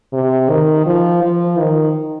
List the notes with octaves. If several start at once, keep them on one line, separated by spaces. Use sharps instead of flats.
C3
D#3
F3
F3
D#3